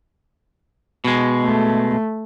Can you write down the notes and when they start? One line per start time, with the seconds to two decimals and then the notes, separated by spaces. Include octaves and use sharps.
1.04 B2 G#3
1.43 A3